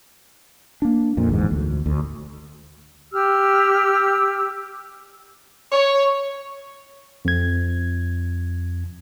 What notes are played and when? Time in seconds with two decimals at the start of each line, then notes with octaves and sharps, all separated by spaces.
0.82 A#3 D4
1.17 F2 A#2
1.29 G1 E2 G#2
1.51 D2
1.86 D2
3.13 G4 E6 F6
5.72 C#5
7.25 F2 G#6